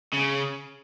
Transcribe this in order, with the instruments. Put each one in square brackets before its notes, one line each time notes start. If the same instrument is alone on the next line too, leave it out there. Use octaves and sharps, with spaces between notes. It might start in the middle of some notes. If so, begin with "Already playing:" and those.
[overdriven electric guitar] C#3